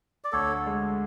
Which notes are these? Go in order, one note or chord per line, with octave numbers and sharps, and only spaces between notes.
D5
D2 A4 C#5
G#3